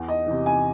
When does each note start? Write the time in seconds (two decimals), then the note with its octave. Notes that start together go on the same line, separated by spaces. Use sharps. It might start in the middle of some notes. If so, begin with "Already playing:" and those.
Already playing: E2
0.08 D#5
0.27 C3 E3
0.46 G#5